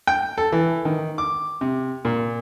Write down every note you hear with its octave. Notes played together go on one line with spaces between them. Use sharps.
G5
A4
E3
D#3
D6
C3
A#2